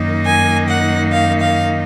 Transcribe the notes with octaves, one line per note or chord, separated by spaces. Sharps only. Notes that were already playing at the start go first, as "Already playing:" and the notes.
Already playing: F#2 D#3 A#3 D#4
G#5
F#5
F5
F5